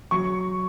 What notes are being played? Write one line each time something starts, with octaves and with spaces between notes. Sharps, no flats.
F#3 C#6